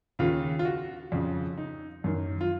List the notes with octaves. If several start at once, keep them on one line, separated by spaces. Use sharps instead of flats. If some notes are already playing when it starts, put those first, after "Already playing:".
D#2 C#3 F4
F4
F#4
F2 C#3
D#4
F#2 D#3
F4